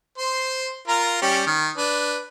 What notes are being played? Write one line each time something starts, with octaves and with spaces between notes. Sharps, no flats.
C5 C6
F4 A#4 A#5
G3 C#4 G4
D#3
D4 B4